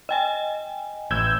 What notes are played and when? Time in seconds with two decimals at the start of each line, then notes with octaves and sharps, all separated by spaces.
0.09 D#5 G5 G#5
1.11 A1 E6 G6 G#6